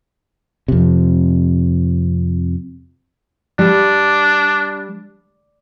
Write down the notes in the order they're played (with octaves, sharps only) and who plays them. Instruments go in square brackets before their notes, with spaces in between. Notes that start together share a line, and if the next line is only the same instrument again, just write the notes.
[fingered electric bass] F2 C3
[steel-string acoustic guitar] G3 [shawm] D4